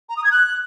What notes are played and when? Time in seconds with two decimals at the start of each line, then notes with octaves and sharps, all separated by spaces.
0.09 A#5
0.17 D#6
0.24 G#6
0.32 F#6